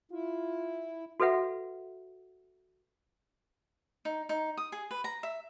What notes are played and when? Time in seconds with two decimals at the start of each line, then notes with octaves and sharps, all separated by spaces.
0.12 E4 F4
1.20 F#4 A4 B4 E5 F#5
4.05 D#4
4.29 D#4
4.57 D#6
4.72 G#4
4.91 B4
5.04 A#5
5.23 E5